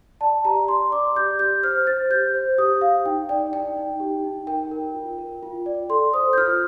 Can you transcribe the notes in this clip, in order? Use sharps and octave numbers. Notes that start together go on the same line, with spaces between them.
D5 A5
G4 A#5
D5 C6
D5 D6
G4 G6
G4 G6
C5 F6
C5 A6
G4 G6
C5
G4 D#6
G4 F5
D#4 G5
D5 G5
D#4 G5
D#4
G4
D#4
A#4 G5
A#4
F4
A#4
F4
D5
A4 C6
C5 D#6
G6
F4 F6